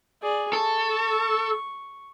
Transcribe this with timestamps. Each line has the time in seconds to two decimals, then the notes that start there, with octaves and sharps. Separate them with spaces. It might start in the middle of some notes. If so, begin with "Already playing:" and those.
0.22 G#4 D5
0.53 A4 C#6